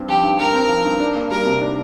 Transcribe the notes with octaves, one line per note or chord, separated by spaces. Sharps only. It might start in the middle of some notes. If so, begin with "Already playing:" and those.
Already playing: G2 C4
F3 G4
G2
G2 A#4
C4
F3
G2
D4
A#3
G3 A#4
C3
D4